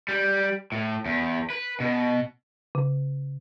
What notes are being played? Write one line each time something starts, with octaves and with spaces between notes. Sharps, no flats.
G3
A2
E2
B4
B2
C#3